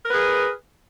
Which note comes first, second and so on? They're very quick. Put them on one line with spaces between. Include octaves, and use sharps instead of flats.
A#4 B4 G#4